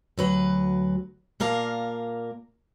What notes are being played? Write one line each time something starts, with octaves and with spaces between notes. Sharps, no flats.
D2 F#3 B4
A#2 A#3 A#4 F5 A5